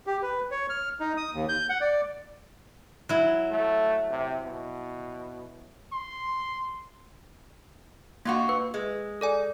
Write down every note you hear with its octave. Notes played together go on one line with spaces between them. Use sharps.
G4
B4
C#5
F6
D#4
D#6
D#2
G6
F#5
D5
F#3 E4
A3
C3
B2
C6
G2 A#3 F4 F#4
B4
G#3
A4 D5 G#5